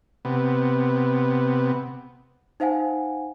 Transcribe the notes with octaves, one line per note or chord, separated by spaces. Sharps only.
C3 B3
D#4 C5 F5 F#5 G#5